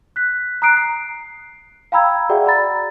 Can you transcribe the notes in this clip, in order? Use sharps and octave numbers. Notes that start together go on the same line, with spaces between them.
F#6 B6
A#5 D#6 F#6 C7 D7
C7
F5 G5 A#5 B5 E6 G#6
F#4 G#4 D5 E5 F#5 G5
D5 A#5 B5 A6